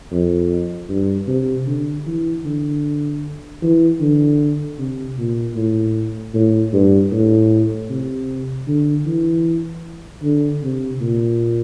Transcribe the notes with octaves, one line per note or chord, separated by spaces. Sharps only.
F2
G2
C3
D3
E3
D3
E3
D3
C3
A#2
A2
A2
G2
A2
C3
D3
E3
D3
C3
A#2